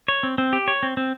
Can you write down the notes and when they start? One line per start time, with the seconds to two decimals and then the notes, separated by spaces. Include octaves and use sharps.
0.08 C#5
0.23 C4
0.38 C4
0.53 G4
0.68 C#5
0.83 C4
0.97 C4